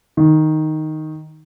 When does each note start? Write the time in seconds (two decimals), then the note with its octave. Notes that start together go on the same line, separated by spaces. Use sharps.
0.17 D#3